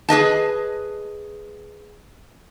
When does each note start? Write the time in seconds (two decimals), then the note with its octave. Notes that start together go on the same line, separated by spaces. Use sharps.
0.09 G#4 B4 D#5 A5